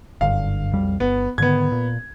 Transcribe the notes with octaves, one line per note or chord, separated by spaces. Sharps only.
F#1 G2 D3 F5
B1 F2 G3
G1 B3
G#2 D3 D#3 B3 G#6
A#2